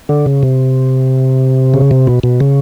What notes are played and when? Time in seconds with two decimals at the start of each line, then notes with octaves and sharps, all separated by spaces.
0.09 D3
0.26 C#3
0.43 C3
1.74 C#3
1.91 C3
2.07 B2
2.23 B2
2.40 C#3